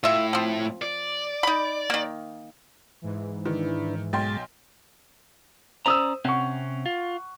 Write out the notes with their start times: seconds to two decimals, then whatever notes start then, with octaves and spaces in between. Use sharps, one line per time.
0.04 A2 F4 E5
0.33 F3 C4
0.82 D5
1.43 D#4 B5
1.90 D#3 A#3
3.02 G#2 E3
3.46 D#3 D4 E4 B4
4.13 B1 G#2 G#3 G5 C6 A6
5.86 C#4 C5 D5 A#5 D#6 E6
6.25 C3 C4 C#4 F#5 C#6
6.86 F4